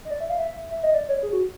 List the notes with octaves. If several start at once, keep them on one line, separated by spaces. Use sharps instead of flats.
D#5
D5
E5
F5
E5
E5
D#5
D5
C#5
G#4
F#4